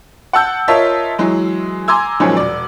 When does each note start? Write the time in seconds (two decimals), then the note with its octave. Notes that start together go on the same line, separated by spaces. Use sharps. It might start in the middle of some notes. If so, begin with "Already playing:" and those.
0.33 F#5 A5 E6 G6
0.68 F4 A#4 C#5 D#5 E5 A5
1.18 E3 F#3 G#3
1.88 G#5 A#5 C6 D6 E6 G#6
2.20 A#2 D#3 F3 F#3 G#3 C#4
2.37 E1 D5